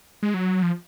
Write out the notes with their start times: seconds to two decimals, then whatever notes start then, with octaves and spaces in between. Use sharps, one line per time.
0.23 G#3
0.34 F#3
0.63 F3